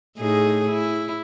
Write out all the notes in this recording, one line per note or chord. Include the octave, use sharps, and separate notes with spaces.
A2 D#4 G#4
E4